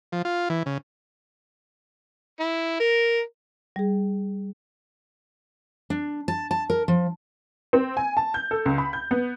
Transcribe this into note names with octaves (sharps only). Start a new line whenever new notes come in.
F3
F4
E3
C#3
E4
A#4
G3 G#4
D4
A5
A5
A#4
F3
C4
G#5
A5
G6
A4
C#2
B5
G6
B3